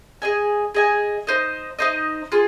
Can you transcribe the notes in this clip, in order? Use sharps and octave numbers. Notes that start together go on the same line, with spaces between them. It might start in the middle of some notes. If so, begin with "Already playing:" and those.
G#4 D#5 G#5
G#4 D#5 G#5
D#4 C5 D#5
D#4 C5 D#5
F4 G#4